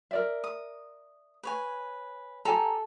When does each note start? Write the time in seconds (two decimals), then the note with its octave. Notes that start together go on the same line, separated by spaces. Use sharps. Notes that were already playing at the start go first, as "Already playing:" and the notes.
0.11 A#4 D5 E5
0.44 D#6
1.43 B4 C#5 G#5
2.45 G4 A4 G#5 A#5